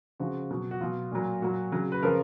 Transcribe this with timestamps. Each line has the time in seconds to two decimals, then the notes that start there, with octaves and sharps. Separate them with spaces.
0.20 C#3 F3 F#4
0.51 B2 F#3
0.71 F#4
0.81 B2 F#3 F4
1.12 A#2 F#3
1.42 A#2 F#3 F#4
1.72 C#3 F#3
1.92 B4
2.03 C#3 F3 A#4